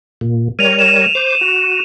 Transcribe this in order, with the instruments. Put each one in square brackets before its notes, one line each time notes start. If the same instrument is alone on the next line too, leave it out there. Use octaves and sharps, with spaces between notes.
[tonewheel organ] A#2
[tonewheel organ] G3 A#4 C#5 [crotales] D#7 F7
[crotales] E7 F7
[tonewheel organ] C5 D6
F#4